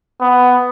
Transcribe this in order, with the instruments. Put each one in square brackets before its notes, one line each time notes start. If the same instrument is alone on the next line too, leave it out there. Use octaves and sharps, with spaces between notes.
[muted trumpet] B3